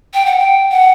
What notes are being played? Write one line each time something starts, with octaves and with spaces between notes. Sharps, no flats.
G5
F#5
G5
F#5